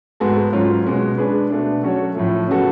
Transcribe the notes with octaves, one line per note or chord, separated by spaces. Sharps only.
G#2 G#3 B3 F#4 A4
G#2 F#3 C#4 F4
B2 G#3 C#4
G#3 D4 G#4 B4
B2 A3 D4
F#3 C#4 F#4 A4 C#5
A2 F3 A3
C#3 F#3 B3 F#4 A4